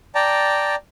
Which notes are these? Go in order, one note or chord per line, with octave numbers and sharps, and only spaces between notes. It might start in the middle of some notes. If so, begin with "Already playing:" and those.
D5 G5 A5 A#5